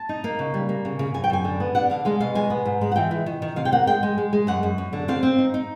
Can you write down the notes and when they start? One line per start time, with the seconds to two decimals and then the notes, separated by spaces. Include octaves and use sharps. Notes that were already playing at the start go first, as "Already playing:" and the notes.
Already playing: A5
0.09 D#4
0.24 A#3
0.39 C#3
0.54 G3
0.69 A#3
0.85 C#3
0.99 C#3
1.14 F#2 G#5
1.24 G5
1.30 F#2 G#5
1.44 D3
1.60 B3
1.75 D4 F#5
1.90 D3 F5
2.05 G#3 F5
2.20 B2 F5
2.35 G#3 G#5
2.50 B3
2.65 G#2
2.81 G#3
2.92 F#5
2.96 E3 G5
3.11 E3
3.26 D#3
3.42 D#3
3.56 C3 F5
3.65 G5
3.72 A#3 F#5
3.87 G#3 G5
4.03 G#3
4.18 G#3
4.33 G#3
4.47 F#2 F#5
4.63 F#2
4.78 F#2
4.93 D3
5.08 C4 F5
5.23 C4
5.38 D#4
5.54 D#4